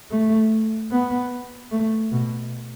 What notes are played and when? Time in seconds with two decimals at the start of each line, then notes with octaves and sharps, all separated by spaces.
0.11 A3
0.91 B3
1.71 A3
2.12 B2